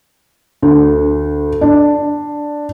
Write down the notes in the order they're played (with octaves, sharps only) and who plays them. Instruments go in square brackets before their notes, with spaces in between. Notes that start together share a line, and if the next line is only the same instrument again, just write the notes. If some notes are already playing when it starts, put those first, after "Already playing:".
[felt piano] D2
D4